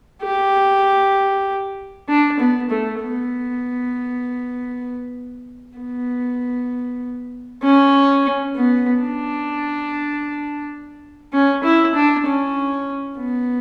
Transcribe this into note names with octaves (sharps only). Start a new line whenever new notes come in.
G4
D4
B3
A3
B3
B3
C#4
B3
D4
C#4
E4
D4
C#4
B3